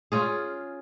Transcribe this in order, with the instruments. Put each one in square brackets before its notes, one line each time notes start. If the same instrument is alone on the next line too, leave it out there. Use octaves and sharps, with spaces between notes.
[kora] C#4 F4 G#4